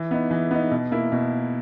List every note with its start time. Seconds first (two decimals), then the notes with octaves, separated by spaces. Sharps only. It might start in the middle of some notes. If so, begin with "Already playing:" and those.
Already playing: E3
0.11 B3 D#4
0.31 E3
0.51 B3 D#4
0.71 B2
0.91 A#3 E4
1.12 B2